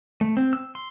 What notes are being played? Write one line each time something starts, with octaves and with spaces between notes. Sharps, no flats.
A3
C4
E6
C6